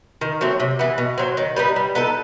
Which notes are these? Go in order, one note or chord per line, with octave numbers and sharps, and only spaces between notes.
D#3
F#3 A3 C4
C3
E3 B3
B2
F#3 C4
D#3
G3 B3 D#4
G3
B3 D#4 A4